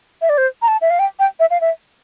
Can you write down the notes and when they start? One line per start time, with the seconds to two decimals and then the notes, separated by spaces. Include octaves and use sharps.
0.22 E5
0.29 D5
0.38 C5
0.62 A#5
0.68 A5
0.81 E5
0.90 F5
0.99 G5
1.19 G5
1.40 E5
1.50 F5
1.61 E5